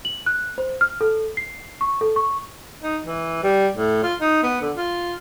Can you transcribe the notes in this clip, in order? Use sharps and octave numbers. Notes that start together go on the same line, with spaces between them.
F#7
F#6
C5
F6
A4
C7
C#6
A4
C#6
D#4
E3
G3
A2
F4
D#4
B3
D3
F4